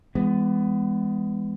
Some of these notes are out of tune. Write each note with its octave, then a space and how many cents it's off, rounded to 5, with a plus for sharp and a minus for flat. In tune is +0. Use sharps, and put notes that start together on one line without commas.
E3 +20 G#3 -20 B3 +20